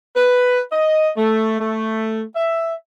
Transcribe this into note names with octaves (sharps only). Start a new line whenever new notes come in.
B4
D#5
A3
A3
E5